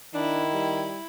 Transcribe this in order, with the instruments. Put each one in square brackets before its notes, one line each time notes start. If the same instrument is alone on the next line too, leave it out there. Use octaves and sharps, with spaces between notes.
[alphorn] D#3 [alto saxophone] D4 [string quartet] E4
[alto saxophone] G3